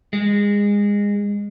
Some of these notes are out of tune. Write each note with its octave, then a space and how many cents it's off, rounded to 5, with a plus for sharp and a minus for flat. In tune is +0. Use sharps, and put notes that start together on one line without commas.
G#3 -25